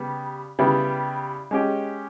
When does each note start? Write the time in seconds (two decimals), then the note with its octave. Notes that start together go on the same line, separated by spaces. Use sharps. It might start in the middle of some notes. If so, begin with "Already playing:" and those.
Already playing: C#3 G3 B3
0.59 C#3 G3 B3 E4
1.51 G#3 C#4 G4